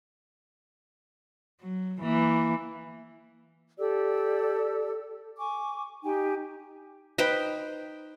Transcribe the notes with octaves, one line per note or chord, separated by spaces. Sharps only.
F#3
E3 A#3
G4 A4 D5 E6
G#5 C#6 D6
D#4 G4 G5 G#5
D#4 B4 C5 G5